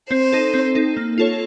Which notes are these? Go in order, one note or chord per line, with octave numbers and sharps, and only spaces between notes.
C4 C5
D#4 A4
C4
D#4 A4
A#3
F4 A4 C#5